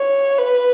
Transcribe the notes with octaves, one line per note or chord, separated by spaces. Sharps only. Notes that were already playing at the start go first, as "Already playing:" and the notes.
Already playing: C#5
B4